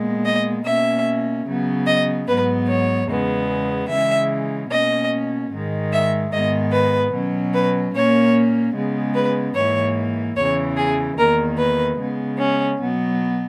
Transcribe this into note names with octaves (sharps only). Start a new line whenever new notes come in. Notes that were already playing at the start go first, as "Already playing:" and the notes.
Already playing: A#2 G#3 B3
D#5
B2 A#3 C#4 E5
C#3 F#3 B3
D#5
G#2 F#3 B3 B4
C#5
E2 C#3 G#3 B3
C#3 E3 G#3 E5
B2 A#3 C#4 D#5
G#2 D#3 G#3
E5
G#2 D#3 G#3 B3 D#5
B4
B2 F#3 C#4
B4
A#2 A#3 C#4 C#5
C#3 G#3 B3
B4
G#2 E3 A#3 C#5
E2 C#3 E3 C#5
G#4
E2 D#3 A#3 A#4
B4
C#3 G#3 B3
C#4
B2 F#3 B3